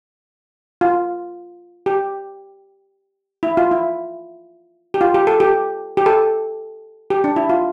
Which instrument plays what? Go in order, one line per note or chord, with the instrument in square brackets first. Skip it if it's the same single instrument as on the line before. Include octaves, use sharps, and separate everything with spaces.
[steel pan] F4
G4
E4
F4
E4
G4
F4
G4
A4
G4
G4
A4
G4
D4
E4
F4